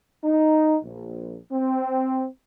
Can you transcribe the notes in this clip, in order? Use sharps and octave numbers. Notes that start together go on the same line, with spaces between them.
D#4
A#1
C4